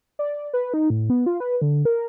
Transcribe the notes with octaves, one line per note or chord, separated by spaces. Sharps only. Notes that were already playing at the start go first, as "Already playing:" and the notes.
D5
B4
D#4
A2
B3
F4
B4
D3
A#4